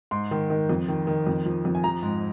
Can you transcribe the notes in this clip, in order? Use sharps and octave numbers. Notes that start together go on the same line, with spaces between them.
G#2 C6
D#3
D#3
F2
D#3
D#3
F2
F3
F2
G#5
F3 A#5
G#2